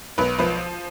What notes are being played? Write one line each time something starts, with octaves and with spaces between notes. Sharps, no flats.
B1 B4
F3 B4